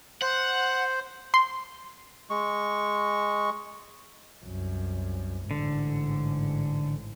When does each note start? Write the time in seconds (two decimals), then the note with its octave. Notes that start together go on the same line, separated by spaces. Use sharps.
0.22 C5 F#5
1.34 C6
2.30 G#3 C#6
4.44 C2 F#2
5.51 A1 G#2 D3